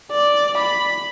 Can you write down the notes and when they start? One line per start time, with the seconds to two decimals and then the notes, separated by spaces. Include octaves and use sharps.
0.12 D5
0.57 B5